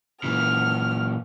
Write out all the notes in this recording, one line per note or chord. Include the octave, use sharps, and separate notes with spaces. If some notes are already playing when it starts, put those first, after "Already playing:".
A#2 E3 F6